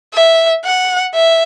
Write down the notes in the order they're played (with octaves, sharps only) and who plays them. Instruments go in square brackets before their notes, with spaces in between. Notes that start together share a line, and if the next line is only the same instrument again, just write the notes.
[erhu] E5
F#5
E5